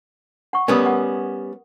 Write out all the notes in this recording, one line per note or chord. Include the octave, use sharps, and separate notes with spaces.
F#5 C#6
G3 B3 C#4 A#4 D#6
F#5